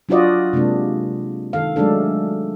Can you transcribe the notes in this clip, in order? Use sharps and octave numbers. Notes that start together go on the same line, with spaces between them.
F#3 D4 F4 F#4 D5 D#5
C3 G#3 A#3 D4
D#3 A4 F5
F#3 G#3 A3 D4 A4